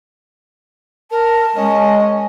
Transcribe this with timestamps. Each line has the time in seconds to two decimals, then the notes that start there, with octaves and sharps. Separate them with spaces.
1.11 A#4 A5
1.56 G#3 C#4 D#5